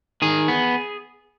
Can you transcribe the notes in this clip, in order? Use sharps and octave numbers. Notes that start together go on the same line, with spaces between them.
D#3 G#4
B3